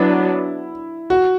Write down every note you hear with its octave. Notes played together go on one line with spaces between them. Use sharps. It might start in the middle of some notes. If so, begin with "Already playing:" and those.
Already playing: F#3 B3 D4 E4
F#4